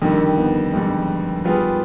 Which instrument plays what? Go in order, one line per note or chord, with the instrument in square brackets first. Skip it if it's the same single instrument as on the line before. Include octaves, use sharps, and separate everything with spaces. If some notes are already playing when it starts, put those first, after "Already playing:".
[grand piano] F2 D3 G3 [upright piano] D#3
[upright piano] B3
[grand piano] F2 D3 G3 [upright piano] G#3
[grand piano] G3 B3 F4 G#4